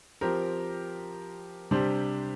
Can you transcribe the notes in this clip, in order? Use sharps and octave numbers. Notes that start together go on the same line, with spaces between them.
F3 C4 G4 A#4
C3 G3 D4 G4 C5